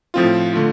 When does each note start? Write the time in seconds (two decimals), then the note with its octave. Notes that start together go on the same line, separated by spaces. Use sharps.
0.14 A2 F3 C4 F4
0.53 D3 A3 F4